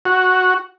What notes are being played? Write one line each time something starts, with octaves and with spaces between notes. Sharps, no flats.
F#4